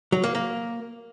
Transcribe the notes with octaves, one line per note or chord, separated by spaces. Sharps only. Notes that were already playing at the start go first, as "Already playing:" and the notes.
F#3
A#3
A#3